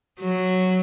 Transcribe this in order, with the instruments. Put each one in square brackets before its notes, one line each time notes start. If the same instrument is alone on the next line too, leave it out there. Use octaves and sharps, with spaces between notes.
[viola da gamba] F#3